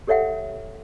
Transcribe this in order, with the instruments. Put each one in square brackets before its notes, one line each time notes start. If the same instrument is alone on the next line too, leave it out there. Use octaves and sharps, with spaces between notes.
[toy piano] G4 A4 C#5 E5 F#5 G5